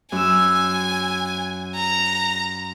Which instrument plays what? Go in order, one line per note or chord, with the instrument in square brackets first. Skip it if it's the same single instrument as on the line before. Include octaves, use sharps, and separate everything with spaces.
[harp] F#2 E6 [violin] G#5
[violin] A#5